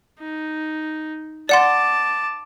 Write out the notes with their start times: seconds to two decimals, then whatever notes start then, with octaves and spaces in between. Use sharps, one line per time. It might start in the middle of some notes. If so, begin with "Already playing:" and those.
0.19 D#4
1.49 D5 F#5 A5 C6 D6